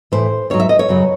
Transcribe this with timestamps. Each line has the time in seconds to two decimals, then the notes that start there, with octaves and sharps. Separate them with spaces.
0.12 A2 E3 C5
0.50 G#2 F#3 C#5
0.60 E5
0.69 D#5
0.79 C#5
0.88 F#2 C#3 F#3